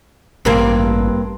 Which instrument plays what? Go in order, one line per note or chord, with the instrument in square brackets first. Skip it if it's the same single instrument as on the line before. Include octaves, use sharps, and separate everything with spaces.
[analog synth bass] A1 [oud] G2 A#3 C4